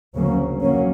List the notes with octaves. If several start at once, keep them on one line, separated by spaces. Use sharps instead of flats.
D2 C#3 F#3 A#3 C#4
F#3 A#3 C#4